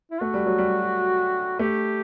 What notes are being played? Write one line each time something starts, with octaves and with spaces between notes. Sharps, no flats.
E4
A3 F#4
G3
F#3
G3
A3 G4